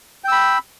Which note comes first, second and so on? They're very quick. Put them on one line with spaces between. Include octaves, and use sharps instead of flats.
G5 E6 B5